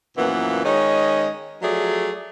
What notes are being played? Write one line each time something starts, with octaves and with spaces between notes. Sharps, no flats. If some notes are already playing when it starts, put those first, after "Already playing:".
F#2 A#2 E3 F3 A#3 B3
D#3 G#3 C#4 C#5 D#5
F3 F#3 A3 G#4 D5